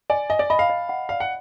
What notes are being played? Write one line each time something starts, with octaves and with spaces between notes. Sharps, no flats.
D5 G#5
D#5 G#5
D5
D#5 B5
F5
D#5
F#5
D5 F5
F#5